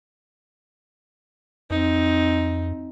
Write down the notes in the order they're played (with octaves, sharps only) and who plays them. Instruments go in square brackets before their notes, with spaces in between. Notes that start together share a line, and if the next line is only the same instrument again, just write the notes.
[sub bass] F2 [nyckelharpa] C4 D#4